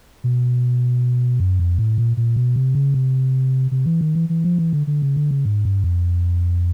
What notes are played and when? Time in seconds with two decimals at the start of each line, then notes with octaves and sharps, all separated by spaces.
0.24 B2
1.40 F#2
1.59 F2
1.78 A2
1.98 A#2
2.17 A#2
2.36 B2
2.56 C3
2.75 C#3
2.94 C3
3.71 C3
3.86 E3
4.01 D#3
4.15 E3
4.29 E3
4.44 F3
4.58 E3
4.73 D3
4.87 D3
5.02 C#3
5.16 D3
5.31 C#3
5.45 G#2
5.65 G2
5.84 F2